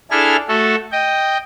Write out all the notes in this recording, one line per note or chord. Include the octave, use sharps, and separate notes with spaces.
D4 E4 G#4 A4 F6
A3 F#4 A4
D#5 G5